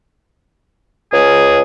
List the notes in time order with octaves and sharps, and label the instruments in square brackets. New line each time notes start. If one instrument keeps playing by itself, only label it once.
[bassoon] C#2 [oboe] G#4